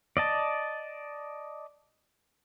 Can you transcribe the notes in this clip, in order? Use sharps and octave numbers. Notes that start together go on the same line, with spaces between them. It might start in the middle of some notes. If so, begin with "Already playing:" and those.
D5 D#5 A5